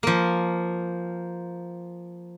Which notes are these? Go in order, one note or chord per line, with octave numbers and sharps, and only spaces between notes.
F3 A#3